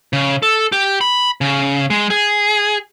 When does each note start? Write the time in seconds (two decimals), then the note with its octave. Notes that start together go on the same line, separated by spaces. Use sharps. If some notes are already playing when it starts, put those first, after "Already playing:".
0.13 C#3
0.43 A4
0.72 G4
1.01 B5
1.41 C#3
1.90 G#3
2.10 G#4